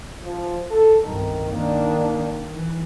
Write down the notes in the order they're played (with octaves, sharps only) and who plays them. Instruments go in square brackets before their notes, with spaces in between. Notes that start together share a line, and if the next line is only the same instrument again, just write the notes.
[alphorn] F3
A4
[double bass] G1 C2 [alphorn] D#3
[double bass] D#3 D4 [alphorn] A#3
[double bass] E3